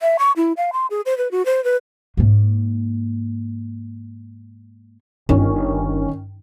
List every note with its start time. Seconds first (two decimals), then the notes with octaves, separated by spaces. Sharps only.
0.01 E5
0.19 C#6
0.36 E4
0.57 F5
0.73 C6
0.90 G#4
1.06 C5
1.18 B4
1.31 F#4
1.46 C5
1.64 B4
2.17 G#2 A#3
5.29 G1 D#3 C#4